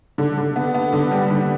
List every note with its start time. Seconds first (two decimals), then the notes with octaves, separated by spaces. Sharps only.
0.18 D3
0.38 D3
0.56 B3
0.74 B3
0.93 D3
1.11 G3
1.31 D3